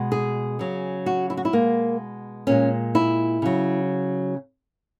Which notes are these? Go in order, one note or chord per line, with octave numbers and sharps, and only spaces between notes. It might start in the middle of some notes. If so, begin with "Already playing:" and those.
Already playing: B2 G#3
G#4
C#3 F#3
F#4
E4
F#4
E4
B2 G#3 A#3
A#2 G#3 C#4
E4
C#3 F#3